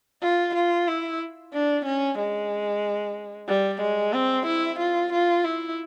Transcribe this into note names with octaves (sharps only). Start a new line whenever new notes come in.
F4
F4
E4
D4
C#4
G#3
G3
G#3
C4
E4
F4
F4
E4